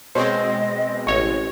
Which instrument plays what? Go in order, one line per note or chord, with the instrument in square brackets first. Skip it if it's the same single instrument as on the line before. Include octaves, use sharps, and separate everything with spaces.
[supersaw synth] B2 G#3 C4 [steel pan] C5 C#5 [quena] D#5
[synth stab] A1 C#5 [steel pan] C#6